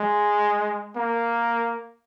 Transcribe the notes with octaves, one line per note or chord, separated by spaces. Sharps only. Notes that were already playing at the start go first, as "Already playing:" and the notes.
Already playing: G#3
A#3